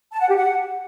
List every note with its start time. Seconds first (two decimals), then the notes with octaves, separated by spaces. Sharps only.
0.12 A5
0.20 F#5
0.28 G4
0.36 F#5